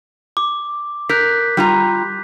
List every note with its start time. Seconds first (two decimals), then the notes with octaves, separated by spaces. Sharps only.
0.37 D6
1.10 A#4 F#6 G6 B6
1.57 G3 F4 A#5